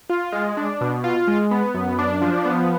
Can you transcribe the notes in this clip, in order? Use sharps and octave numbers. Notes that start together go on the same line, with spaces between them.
F4
G#3
D4
B2
F4
G#3
B3
F#2
D4
F3
B3